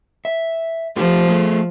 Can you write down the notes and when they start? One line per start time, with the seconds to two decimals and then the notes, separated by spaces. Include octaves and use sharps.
0.25 E5
0.96 F3 A3 F4 G4
1.28 A3 G#4 A4